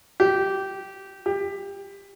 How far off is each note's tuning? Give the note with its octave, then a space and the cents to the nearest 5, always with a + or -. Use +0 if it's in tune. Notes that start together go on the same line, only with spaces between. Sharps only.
G4 -15
G4 +20